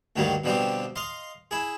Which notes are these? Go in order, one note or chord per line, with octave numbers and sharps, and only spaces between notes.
D2 G2 D#3 F#3 G3 A#3
B2 D3 F3 G3 C4 G4
D#5 F5 C6
E4 G#4